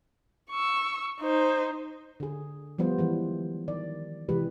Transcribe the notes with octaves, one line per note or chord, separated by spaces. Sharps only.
C#6 E6
D#4 C5
D3 G#4
F3 G3 B3 F4 C5
D#3 E3 G#3
D#3 D5
C3 E3 G#3 G4 B4